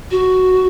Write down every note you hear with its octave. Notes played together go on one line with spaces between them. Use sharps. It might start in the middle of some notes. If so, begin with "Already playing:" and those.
F#4